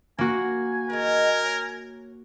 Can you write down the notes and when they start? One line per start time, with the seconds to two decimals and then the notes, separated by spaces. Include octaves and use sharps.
0.19 A#3 F#4 A#4 G#5
0.90 D#3 G#3 B3 A#4
1.45 C#5